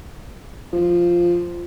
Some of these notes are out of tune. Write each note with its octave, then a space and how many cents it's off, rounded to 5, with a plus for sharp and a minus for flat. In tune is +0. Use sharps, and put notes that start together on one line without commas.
F3 -5